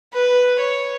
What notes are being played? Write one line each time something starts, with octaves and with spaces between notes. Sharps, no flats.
B4
C#5